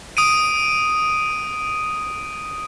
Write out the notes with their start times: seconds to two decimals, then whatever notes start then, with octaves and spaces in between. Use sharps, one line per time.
0.17 D#6 D7 D#7